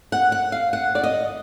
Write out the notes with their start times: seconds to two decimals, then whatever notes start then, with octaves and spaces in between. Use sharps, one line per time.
0.12 F#5
0.32 F#5
0.52 F5
0.73 F#5
0.95 D5
1.03 D#5